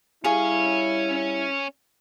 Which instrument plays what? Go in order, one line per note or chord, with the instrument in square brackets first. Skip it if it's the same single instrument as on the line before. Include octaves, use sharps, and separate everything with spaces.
[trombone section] G3 E4 [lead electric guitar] C#4 C#5 [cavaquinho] G#4 F5